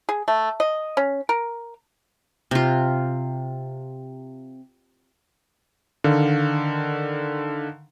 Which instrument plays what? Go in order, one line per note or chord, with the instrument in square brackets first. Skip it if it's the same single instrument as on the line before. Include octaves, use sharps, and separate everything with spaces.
[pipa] G#4
A3
D#5
C#4
A#4
[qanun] C3 F4
[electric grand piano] D3 D#3 F5